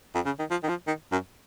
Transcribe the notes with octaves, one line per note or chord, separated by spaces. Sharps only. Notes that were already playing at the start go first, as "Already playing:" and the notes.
F2
C#3
D#3
F3
D#3
F3
D#3
F#2